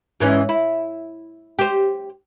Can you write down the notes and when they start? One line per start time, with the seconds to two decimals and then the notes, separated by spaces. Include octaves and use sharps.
0.20 G#2 E3 C#4
0.49 E4
1.59 G4 C5